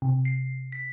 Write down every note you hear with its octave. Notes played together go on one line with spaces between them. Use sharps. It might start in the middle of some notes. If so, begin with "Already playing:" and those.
C3
C7
B6